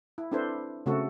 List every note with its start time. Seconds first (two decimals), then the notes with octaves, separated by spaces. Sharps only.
0.18 E4
0.32 C4 D4 E4 A4 B4 C5
0.86 C#3 A3 C4 F#4 A4